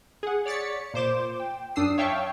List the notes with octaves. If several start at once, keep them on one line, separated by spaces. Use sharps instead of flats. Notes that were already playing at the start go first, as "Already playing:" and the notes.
G#4 F#5
C#5 D5 A6 B6 C#7
A#2 C5 D6 E7
G5
F#2 D4 D#6 E6 C7
C#5 E5 F5 G5 A5 C#6